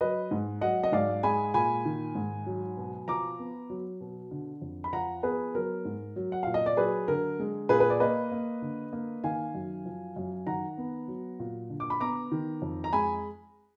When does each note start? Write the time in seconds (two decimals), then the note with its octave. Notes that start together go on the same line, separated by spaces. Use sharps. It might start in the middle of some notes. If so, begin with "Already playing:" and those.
0.01 F#3 B4 D#5
0.31 G#2
0.61 F#3 D#5 F#5
0.83 D#5
0.92 G#2 D5 F5
1.23 G#3 G#5 B5
1.54 A#2 G#5 B5
1.85 D#3
2.15 G#2
2.46 F#3
2.77 B2
3.08 F3 A#5 D6
3.39 B3
3.70 F#3
4.01 B2
4.31 D3
4.62 F2
4.84 B5
4.93 F3 F#5 A#5
5.23 B3 G#4 B4
5.55 F#3 A#4
5.85 G#2
6.16 F#3
6.32 F#5
6.43 A#2 F5
6.54 D#5
6.66 D5
6.77 F#3 G#4 B4
7.08 D3 A#4
7.40 G#3
7.69 A#2 G#4 B4
7.80 B4
7.90 D5
8.00 A#3 B4 D#5
8.32 A#3
8.62 D3
8.93 A#3
9.24 D#3 F5 G#5
9.54 F#2
9.85 F3
10.16 F#2
10.47 D#3 F#5 A#5
10.78 B3
11.08 F#3
11.40 A#2
11.70 D3
11.80 D6
11.90 B5
12.00 B3 A#5 D6
12.32 D#3
12.62 F2
12.84 A#5
12.92 G#3 G#5 B5